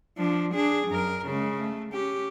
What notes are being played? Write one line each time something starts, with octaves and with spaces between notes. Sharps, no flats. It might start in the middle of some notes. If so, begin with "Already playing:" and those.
F3 D4
D4 G#4
F#2 A#4
C#3 G#3
A3
C#4 G4